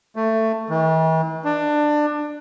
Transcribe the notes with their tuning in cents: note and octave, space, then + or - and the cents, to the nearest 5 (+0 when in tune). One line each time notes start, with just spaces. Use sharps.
A3 +15
E3 -45
D4 +20